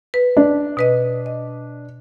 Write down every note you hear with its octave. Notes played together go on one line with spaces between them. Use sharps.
B4
D4
B2 B4 D#5
D#5